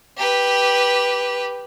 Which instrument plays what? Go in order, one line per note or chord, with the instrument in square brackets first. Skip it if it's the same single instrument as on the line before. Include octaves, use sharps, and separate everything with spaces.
[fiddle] G4 B4